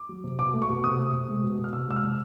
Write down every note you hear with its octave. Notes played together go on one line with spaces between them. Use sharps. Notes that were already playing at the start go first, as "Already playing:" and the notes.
Already playing: D6
F#3
C3
B2 D6
A3
C#6
B2
C3 D#6
A3
C3
G#3
B2
B2
F6
C3 E6
G#3 E6
F6
C3